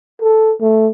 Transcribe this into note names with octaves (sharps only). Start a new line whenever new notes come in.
A4
A3